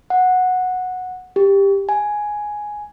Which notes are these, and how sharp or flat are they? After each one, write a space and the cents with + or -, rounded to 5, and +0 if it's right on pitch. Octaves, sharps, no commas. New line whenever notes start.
F#5 -10
G4 +15
G#5 +5